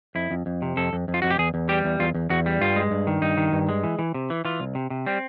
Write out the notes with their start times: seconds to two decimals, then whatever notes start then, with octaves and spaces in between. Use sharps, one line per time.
0.15 F2 E4
0.31 F2
0.46 F2
0.62 C3
0.77 F2 A4
0.93 F2
1.08 F2
1.14 F4
1.22 F2 F#4
1.30 G4
1.38 E2 G#4
1.54 E2
1.69 G3 G4
1.84 E2
2.00 E2 F4
2.14 E2
2.30 E2 F#4
2.46 G3
2.61 G2 F4
2.76 G#3
2.91 G2
3.07 D#3
3.22 G2 D#4
3.37 D#3
3.52 G2
3.69 G#3
3.84 E3
3.99 E3
4.14 C3
4.30 E3
4.45 E3 F4
4.60 C2
4.75 C3
4.90 C3
5.06 G3 C4